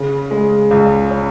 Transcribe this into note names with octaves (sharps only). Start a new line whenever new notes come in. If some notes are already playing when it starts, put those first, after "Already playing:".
Already playing: C#3
G#3
C#2
C#4